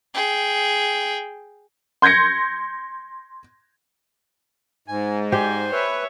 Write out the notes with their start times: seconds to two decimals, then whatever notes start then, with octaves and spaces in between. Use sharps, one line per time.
0.14 G#4 G5
2.02 C6 G6 G#6 A#6 C#7
4.88 G#2 G#5
5.32 G4 C5 D5 G#5
5.71 B4 C#5 E5